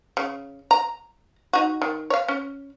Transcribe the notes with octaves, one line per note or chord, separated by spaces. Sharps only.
C#3
A#5
D#4 F#4
D#3
C#5 F5
C#4